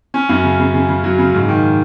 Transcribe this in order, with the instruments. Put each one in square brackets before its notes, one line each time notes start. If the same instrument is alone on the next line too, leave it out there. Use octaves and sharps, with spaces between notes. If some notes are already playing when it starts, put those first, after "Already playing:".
[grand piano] C#4
F#2
C#3
C#3
C#3
C#3
F#3
C#3
G#2
D#3